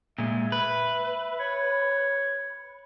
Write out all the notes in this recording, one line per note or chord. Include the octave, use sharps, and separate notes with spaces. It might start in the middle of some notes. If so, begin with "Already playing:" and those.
A#2 G#3 E5
B4
C#5